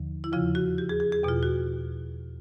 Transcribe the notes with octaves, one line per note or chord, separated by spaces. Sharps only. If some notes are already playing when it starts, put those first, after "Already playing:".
Already playing: D#2 D3 F3
E4
E2 C#3 F3 F4
F#4
G4
G#4
G#4
G#4
E2 B2 F4
F#4